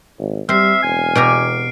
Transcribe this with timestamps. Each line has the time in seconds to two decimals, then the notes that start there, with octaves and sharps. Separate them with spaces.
0.19 G#1
0.49 G3 C4 E5 F6 C7
0.83 E1 G#5
1.15 B2 G4 A#5 D7